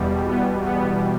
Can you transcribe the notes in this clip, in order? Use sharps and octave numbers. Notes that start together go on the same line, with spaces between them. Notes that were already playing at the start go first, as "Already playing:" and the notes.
Already playing: E2 B2 G3
B3
B3